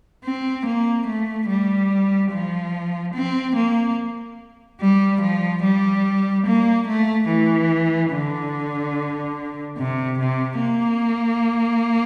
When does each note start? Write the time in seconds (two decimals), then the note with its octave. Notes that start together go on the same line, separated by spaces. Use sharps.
0.24 C4
0.66 A#3
1.07 A3
1.49 G3
2.32 F3
3.15 C4
3.56 A#3
4.80 G3
5.22 F3
5.63 G3
6.46 A#3
6.88 A3
7.29 E3
8.12 D3
9.78 C3
10.19 C3
10.60 A#3